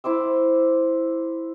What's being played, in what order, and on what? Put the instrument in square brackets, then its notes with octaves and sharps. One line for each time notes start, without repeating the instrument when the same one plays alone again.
[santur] E4 C5 D6 E6